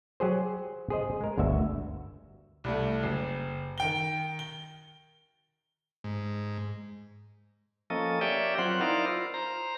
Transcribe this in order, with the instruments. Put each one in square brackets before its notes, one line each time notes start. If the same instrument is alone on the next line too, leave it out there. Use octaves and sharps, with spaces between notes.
[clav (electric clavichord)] F#3 G4 G#4 C5
G#4 C5 D#5
G#3 A#4
G1 D2 F#4 E5
[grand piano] C2 G3 A3
F#1
D#3 G5 G7
G7
[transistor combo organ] G#2
[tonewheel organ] F3 A#3 C#4 A4 D#5
G4 A#4 C#5 D5 E5 G5
F#3 C4 F4 C5 F#5
D#4 E4 A#4 C5 D5 F5
F4
C5 A#5